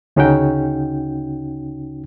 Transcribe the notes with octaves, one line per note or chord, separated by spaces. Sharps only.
D2 C#3 C#4 D#4 F#4 G5